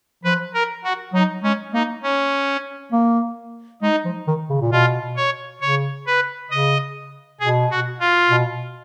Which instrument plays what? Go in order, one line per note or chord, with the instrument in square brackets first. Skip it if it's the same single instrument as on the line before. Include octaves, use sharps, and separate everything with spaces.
[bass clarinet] F3 [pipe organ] B4
[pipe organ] A#4
F#4
[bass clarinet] F#3 [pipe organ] D#4
[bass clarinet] G#3 [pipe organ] C#4
[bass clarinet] A#3 [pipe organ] D#4
[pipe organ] C#4
[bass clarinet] A#3
[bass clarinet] G#3 [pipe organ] D#4
[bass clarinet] F3
D#3
C#3
A#2
[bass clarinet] B2 [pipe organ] F4
[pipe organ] C#5
[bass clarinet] C#3 [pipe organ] C#5
[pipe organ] B4
[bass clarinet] C#3 [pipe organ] D#5
[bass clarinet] B2 [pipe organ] G#4
[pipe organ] F#4
F4
[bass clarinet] B2